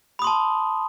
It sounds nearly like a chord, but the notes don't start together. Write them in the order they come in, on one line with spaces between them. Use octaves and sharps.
B5 D#6 C6 A5